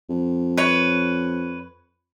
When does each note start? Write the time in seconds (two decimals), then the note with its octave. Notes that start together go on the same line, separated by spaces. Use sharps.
0.09 F2
0.57 B4 C#5